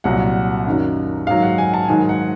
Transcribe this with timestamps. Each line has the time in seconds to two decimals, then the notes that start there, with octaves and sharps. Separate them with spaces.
0.04 C2 A#2 F#3 F#5
0.66 F#2 D#3 F#3
1.27 G#2 D#3 F#3 F5
1.42 F#5
1.58 G#5
1.74 A5
1.88 G#2 D#3 F#3 G#5
2.09 F#5